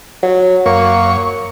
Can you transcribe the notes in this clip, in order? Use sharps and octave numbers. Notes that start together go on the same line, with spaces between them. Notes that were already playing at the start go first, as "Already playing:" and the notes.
F#3
F#2 A#3 C#5 C#6